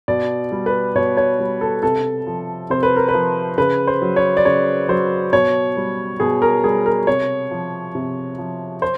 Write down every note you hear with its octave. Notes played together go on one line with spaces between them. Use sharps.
B2 D5
G3
B4
B2 C#5
C#5
G3
A4
C3 A4
F3
C3 C5
B4
A#4
B4
F3
C#3 B4
C5
F#3
C#5
D5
C#3 C#5
F#3 C5
B2 C#5
G3
B2 G#4
A#4
G3 G#4
A#4
C3 C#5
F3
C3
F3
C5